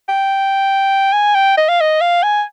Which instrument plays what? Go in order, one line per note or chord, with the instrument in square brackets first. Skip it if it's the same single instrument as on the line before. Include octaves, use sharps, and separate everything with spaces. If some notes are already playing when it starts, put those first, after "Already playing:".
[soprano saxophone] G5
G#5
G5
D#5
F5
D#5
F5
G#5